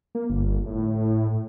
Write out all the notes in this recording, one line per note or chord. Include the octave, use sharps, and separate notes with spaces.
A#3
G1
A2